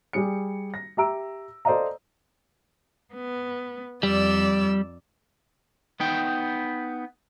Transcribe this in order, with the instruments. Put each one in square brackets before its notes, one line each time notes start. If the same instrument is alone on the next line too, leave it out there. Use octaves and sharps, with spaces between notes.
[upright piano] G3 G#4 C#7
A#6
G4 E5 A#5 E6 D7
A4 C5 D5 D#5 F5 A#5
[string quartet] B3
[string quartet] F2 D5 E6 [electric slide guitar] G3
[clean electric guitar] B3 D#4 G5